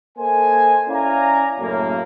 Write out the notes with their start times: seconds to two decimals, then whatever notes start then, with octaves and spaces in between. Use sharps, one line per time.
0.18 A#3 A4 C5 D#5 G#5
0.89 C#4 E4 D5 F5 G#5 A#5
1.60 F#2 A2 C#3 F#3 A#3